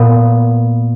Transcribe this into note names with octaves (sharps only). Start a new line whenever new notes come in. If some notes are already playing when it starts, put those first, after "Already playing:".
Already playing: A#2 B3